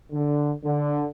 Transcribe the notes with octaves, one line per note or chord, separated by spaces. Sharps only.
D3
D3